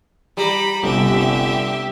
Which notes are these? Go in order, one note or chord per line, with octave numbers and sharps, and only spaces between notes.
G3 A#5 B5
G1 C2 C3 G4 E5